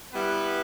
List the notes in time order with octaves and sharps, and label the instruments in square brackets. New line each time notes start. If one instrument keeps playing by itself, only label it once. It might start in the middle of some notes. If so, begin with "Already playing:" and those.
[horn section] G3 B3 E4 B4